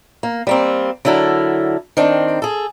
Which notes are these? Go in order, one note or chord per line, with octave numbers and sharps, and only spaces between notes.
A#3
G3 A#3 C4
D3 F#3 E4 A4 A#4
D#3 C4 D4
G#4 A4